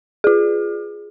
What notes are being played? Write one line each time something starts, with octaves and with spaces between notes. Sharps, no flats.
F4 G#4